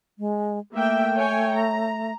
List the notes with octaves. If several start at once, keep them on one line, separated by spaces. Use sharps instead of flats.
G#3
A3 A#3 E5 G5
C#5 G5 G#5
A#5